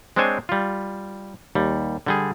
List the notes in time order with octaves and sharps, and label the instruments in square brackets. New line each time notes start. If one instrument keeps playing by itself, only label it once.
[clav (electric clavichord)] G#3 C4 D4 C5 C#5 G#5
G3 F4
D#2 G3
D3 G3 G#4